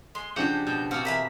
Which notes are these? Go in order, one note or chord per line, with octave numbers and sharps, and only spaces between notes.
G#3 C6
C#3 F3 D4 F#4 G4 F#5 G6
B2 G6
B2 A#3 C4 F#4 F6
E3 E4 A#4 B6